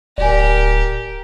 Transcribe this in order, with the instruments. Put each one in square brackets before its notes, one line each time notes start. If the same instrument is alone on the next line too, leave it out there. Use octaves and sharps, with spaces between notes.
[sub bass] D1 [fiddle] G4 A#4 [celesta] D5 G#5